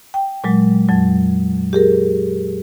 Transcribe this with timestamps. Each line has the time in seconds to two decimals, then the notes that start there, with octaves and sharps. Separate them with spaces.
0.14 G5
0.44 A#2 F#3 G#3
0.88 F2 F#3
1.73 G4 G#4 A#4